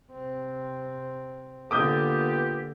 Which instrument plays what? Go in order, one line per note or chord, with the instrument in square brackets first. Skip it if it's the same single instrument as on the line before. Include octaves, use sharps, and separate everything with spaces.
[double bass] C3 C4
[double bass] D3 A#3 [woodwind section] B3 F4 G4 [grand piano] D6 D#6 G6